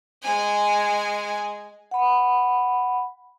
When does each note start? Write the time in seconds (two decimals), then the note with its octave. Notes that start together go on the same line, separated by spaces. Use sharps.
0.22 G#3 G#5
1.91 F#5 B5